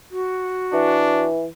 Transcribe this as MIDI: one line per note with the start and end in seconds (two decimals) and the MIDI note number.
0.11 1.25 66
0.73 1.46 52
0.73 1.28 62